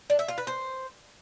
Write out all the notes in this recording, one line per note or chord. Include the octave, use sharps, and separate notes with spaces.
D4
E5
F4
B4
C5